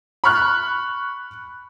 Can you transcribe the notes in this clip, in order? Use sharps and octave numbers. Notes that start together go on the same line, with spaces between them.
B5 C#6 F6 F#6